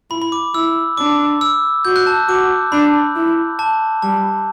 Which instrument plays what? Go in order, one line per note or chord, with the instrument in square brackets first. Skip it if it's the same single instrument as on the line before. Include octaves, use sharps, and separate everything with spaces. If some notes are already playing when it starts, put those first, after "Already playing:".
[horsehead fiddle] E4 [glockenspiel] B5
[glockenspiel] B5
D6
[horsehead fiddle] E4 [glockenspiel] E6
[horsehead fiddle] D4 [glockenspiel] D6
[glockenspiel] E6
[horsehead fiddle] F#4 [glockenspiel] G6
[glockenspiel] F#6
A5
[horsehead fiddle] F#4 [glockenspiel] D6
[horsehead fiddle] D4 [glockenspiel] B5
[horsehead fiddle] E4
[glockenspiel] A5
[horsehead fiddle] G3 [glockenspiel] A5